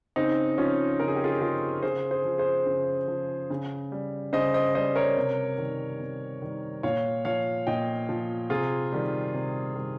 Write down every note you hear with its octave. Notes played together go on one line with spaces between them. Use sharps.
C#3 C4 D#4
F3 C#4 F4
C#3 A#4
G#4
G4
F4 G#4
F3 F4 G#4
C#3 G#4 C5
G#4 C5
F3
G#4 C5
C#3
F3
C#3
G3
C#3 C5 D#5
C5 D#5
G3 C5 D#5
A#4 C#5
C3
D#3 G3
C3
D#3 G3
A#2 C#5 F5
F3 C#5 F5
A#2 D#5 G5
F3
C3 F4 G#4
D#3 G3
C3
D#3 G3